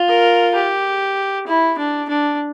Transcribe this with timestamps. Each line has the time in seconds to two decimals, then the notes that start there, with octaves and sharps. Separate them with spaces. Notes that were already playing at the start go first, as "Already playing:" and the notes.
Already playing: F4
0.09 A#4
0.55 G4
1.47 E4
1.78 D4
2.09 D4